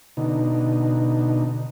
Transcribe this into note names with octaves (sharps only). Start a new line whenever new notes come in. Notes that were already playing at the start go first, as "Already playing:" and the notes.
B2 D3 D#4